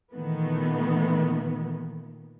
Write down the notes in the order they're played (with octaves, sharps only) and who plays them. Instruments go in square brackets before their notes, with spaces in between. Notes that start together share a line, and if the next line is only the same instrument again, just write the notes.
[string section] A#2 D#3 E3 A3 B3